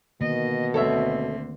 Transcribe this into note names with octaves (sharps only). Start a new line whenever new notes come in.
B2 D3 D#3 A#3 D#5
D2 C4 A4 C#5 E5